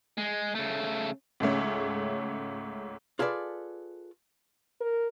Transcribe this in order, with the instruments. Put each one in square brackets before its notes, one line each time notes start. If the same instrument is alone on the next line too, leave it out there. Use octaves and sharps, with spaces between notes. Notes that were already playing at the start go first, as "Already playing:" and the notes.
[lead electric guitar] G#3
C#3 A3
[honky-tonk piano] C#2 G#2 A3 C#4
[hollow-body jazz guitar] F4 G#4 A4 B4 D5
[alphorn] A#4